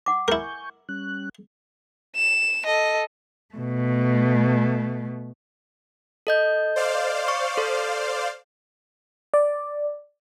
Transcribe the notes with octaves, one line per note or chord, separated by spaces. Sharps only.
F#5 D6
E4 A#4 G#5 C#6 G6
G3 C#4 F#6
E7
A4 D#5
B2 A3
A4 D#5 G6
C5 D5 F5
C#6
A4
D5